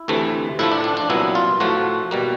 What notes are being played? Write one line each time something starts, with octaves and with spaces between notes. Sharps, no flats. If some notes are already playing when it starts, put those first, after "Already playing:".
Already playing: E4
D2 C3 E3 A3
A2 F3 A3 E4
D4
D4
D4
C2 A#2 F#3 B3 E4
F4
A2 F3 A3 F#4
B2 G3 A#3